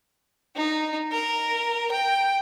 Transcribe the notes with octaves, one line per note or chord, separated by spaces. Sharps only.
D#4
A#4
G5